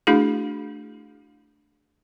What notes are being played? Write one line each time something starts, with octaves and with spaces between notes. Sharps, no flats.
A3 D4 E4 F#4 G#4